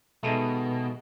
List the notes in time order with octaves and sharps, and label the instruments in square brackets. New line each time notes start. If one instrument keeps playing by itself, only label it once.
[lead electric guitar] B2 [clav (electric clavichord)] D#3 G#3 A3